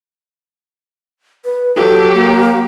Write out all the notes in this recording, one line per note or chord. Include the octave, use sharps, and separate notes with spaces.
B4
F#3 G4 A4
A#3